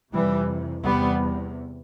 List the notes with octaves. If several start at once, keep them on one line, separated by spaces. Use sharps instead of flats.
F2 C3 E3 G3
E2 C3 G3 B3